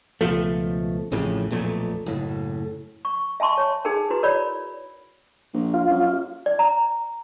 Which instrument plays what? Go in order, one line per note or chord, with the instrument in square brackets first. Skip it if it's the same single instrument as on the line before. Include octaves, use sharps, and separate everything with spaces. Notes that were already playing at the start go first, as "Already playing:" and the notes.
[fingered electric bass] C#2 B2 F3 A3
A1 F2 A2 C#3
B1 F2 A#2 A3
F#1 A2
[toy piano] C#6
E5 G#5 A5 C6 C#6
C#5
D#4 G#4 A#4 G#5
E4 F#4 B4
A#4 C#5 D5 B5
[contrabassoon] A#1
[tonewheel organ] F4
[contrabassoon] F#2
[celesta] D5
A#5